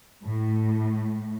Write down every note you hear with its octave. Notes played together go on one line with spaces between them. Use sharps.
A2